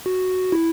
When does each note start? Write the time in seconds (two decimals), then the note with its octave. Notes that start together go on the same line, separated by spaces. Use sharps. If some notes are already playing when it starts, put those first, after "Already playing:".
0.06 F#4
0.52 E4